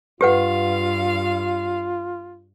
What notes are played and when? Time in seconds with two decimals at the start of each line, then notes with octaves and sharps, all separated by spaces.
0.21 G2 F4 G4 B4 F5 F#5